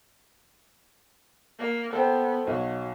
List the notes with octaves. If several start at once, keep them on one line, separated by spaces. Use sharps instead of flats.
A#3
B3 A4 C5 G5
B1 F#3